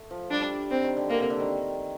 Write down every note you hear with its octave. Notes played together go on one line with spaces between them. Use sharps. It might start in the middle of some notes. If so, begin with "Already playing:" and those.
Already playing: A3
F3
G3 D4
C4
D#3
D3
D3 A#3
C3
D3
D#3